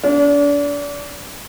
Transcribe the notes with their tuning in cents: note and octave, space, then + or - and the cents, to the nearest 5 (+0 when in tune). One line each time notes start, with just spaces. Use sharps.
D4 -35